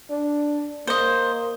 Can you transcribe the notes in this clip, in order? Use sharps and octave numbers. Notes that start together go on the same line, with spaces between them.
D4
A#3 C5 D#5